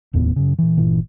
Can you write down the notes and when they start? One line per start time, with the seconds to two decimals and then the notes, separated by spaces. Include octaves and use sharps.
0.13 F1 D#2 A2 B3
0.36 F#2 C#3
0.59 A#2 E3
0.78 G1 A#2 E3